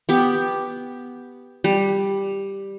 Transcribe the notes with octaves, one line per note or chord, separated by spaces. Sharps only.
B3 G4
G3